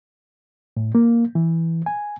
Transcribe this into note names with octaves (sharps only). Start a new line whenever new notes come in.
A2
A#3
E3
G#5